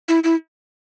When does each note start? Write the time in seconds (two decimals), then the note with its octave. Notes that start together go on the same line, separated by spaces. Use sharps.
0.08 E4
0.24 E4